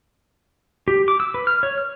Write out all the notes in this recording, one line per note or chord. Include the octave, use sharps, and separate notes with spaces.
G4
D6
E6
B4
F6
C#5
F6